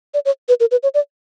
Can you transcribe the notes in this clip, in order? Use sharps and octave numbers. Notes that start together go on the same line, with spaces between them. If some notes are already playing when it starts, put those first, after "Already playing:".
D5
C#5
B4
A#4
B4
C#5
D5